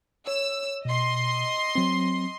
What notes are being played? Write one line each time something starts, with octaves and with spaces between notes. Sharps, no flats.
C#5 E6
B2 D#5 C6
F#3 C4